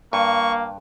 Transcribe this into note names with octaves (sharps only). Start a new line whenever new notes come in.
G2 A#3 C#6